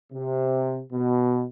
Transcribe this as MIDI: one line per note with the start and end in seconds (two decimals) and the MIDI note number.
0.12 0.82 48
0.92 1.46 47